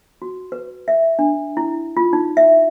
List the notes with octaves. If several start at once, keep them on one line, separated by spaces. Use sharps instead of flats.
F#4
B4
E5
D4
E4
F4
D#4
E5